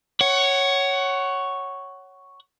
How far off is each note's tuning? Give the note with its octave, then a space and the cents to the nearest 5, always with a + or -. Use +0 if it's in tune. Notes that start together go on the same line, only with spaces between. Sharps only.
C#5 +0 F#5 +20